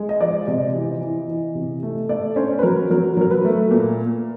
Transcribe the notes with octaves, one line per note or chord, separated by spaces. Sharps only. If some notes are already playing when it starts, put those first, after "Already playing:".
Already playing: G#3
D#5
F3 D5
C3 D#5
E3
E3
E3
C3
A3
A3 D5
C#4 C5
B4
F#3 A#4
F#3 A#4
F#3 A#4
B4
A3
A#2 A#4